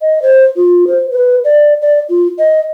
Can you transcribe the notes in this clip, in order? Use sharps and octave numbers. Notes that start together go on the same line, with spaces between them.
D#5
C5
F4
C5
B4
D5
D5
F4
D#5